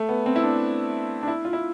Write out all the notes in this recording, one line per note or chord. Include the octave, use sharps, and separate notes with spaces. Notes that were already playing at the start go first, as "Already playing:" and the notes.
Already playing: A3
B3
C4
E4
D4
D4
E4
F4
E4